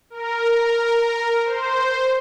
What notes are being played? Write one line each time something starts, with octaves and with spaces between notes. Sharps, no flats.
A#4
C5